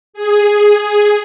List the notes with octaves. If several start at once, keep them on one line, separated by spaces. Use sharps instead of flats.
G#4